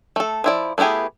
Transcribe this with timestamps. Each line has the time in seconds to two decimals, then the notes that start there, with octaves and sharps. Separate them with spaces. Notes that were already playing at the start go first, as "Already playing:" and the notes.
0.16 A3 A4
0.44 F3 E4 D5
0.78 A3 B3 E4 G4 G#4